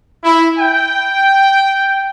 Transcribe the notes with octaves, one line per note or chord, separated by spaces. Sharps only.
E4
G5